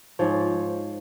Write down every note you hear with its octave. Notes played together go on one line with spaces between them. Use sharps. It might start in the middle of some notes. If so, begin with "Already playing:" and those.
G#2 F3 C#5